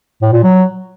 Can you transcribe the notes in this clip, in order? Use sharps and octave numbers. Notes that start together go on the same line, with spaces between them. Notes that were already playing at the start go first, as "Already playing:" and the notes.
A2
A#2
F#3